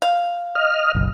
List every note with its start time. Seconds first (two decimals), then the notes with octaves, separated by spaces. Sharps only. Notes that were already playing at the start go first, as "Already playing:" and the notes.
0.02 F5
0.55 D#5 F6
0.95 F#1 B1